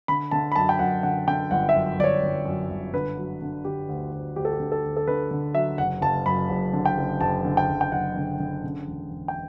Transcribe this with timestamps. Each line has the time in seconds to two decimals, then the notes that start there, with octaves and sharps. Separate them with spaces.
0.08 D3 B5
0.31 D3 A5
0.52 B5
0.56 F#2 A5
0.69 G5
0.79 F#2 F#5
1.03 D3 F#5
1.28 D3 G5
1.51 G1 F#5
1.69 E5
1.75 F#2
1.99 G1 D5
2.04 C#5
2.23 G1
2.45 F#2
2.70 G1
2.93 D3 B4
3.18 F#3
3.42 D3
3.65 D3 G4
3.89 D2
4.13 D2
4.36 D2 G4
4.45 A4
4.53 G4
4.60 D3
4.72 A4
4.84 D2
4.97 A4
5.07 D3 B4
5.31 D3
5.54 F#3 E5
5.78 F#1 F#5
6.02 F#1 A5
6.26 F#2 B5
6.50 F#1
6.73 D3
6.85 G5
6.97 F#1
7.21 F#1 A5
7.45 D3
7.57 G5
7.69 F#1
7.81 G5
7.92 F#1 F#5
8.16 D3
8.40 D3
8.64 C#3
8.87 E1
9.11 E1
9.28 G5